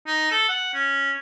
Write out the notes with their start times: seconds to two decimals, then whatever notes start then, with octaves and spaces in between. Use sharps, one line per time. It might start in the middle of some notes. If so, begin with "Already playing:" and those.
0.07 D#4
0.31 A4
0.49 F#5
0.74 C#4